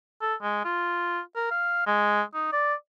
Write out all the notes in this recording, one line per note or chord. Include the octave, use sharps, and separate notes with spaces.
A4
G#3
F4
A#4
F5
G#3
D#4
D5